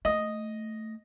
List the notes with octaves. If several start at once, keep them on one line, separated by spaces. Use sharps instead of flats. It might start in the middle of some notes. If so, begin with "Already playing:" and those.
A3 D#5